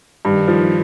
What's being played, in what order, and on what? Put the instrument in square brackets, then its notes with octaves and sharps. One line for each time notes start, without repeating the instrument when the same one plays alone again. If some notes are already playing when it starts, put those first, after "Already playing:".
[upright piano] G2 [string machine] D#3
[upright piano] F3